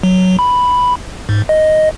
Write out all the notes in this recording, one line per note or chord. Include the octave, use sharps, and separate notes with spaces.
F#3
B5
G#2
D#5